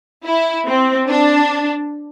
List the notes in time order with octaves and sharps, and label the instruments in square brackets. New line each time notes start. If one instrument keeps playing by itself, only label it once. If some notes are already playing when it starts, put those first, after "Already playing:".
[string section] E4
C4
D4